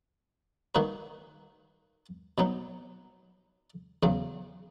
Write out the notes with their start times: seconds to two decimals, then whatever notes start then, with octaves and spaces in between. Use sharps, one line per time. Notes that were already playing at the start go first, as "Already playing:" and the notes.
0.75 D#3 A#3 D#4 F#4 B4
2.38 B2 F#3 B3 D#4
4.03 E2 C#3 F#3